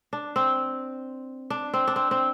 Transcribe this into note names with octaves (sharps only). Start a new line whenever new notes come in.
D4
C4
D4
C4
D4
C4
C4